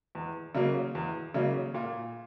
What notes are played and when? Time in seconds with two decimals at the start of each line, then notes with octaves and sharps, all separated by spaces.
0.15 E2
0.55 C#3 F#3 A#3 C#4
0.95 E2
1.34 C#3 F#3 A#3 C#4
1.74 A#2